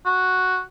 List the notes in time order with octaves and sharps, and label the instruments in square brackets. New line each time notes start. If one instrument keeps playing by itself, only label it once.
[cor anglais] F#4